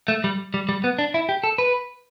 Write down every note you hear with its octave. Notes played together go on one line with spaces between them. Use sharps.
A3
G3
G3
G3
B3
D4
E4
G4
A4
B4